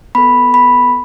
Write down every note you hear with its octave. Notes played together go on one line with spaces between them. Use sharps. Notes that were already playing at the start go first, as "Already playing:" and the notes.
B3 A4 B5
B5